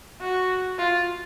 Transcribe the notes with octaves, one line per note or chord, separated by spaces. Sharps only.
F#4
F4